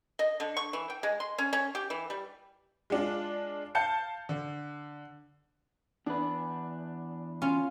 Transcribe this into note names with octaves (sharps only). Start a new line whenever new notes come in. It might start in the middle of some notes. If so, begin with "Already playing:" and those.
D#5
D3
C#6
E3
G5
G#3
C6
C#4
C#4
G4
E3
G3
G#3 D4 F4
F5 A5 G6 C#7
D3
E2 D4 B4
C#4 F4